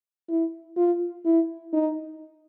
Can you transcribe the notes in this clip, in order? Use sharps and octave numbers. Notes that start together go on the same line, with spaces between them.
E4
F4
E4
D#4